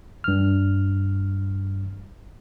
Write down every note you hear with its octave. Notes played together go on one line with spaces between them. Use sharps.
G2 F6